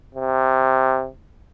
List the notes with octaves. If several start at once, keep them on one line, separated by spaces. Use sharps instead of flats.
C3